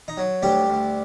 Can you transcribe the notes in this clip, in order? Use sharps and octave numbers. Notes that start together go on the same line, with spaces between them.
D#4
F#3
D2 G3 G4
D2